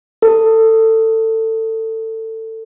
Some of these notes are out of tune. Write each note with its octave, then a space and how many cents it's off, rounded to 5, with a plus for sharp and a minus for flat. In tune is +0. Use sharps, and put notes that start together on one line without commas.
A4 +20